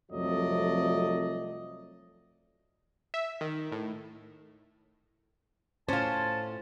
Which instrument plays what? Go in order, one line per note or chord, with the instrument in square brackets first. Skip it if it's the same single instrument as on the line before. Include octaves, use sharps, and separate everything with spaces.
[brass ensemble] C2 F2 F#3 A3 D5 D#5
[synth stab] E5
D#3
A2
[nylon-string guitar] A2 C5 [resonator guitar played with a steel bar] C#4 F4 [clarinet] A5